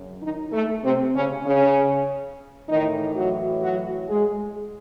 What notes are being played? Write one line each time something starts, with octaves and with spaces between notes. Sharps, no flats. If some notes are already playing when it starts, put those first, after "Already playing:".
Already playing: F#2 C#3 F#3
D#3 D#4
A3
C3 C4
C#3 C#4
C#3 C#4
A2 D#3 E3 D#4
F#3 F#4
F#3 F#4
G#3 G#4